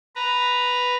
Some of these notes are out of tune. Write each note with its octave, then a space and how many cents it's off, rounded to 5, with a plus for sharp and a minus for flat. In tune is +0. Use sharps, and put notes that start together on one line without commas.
B4 +0 A#5 +0